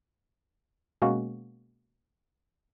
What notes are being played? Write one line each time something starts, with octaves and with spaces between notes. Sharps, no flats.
B2 G#3 A#3 C#4 F#4